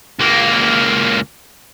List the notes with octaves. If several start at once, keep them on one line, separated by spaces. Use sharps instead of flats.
C#2 A#3